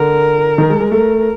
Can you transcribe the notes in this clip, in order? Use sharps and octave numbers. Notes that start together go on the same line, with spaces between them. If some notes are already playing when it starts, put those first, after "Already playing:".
Already playing: D3 A#4
D#3
G#3
G#3
A3 A#4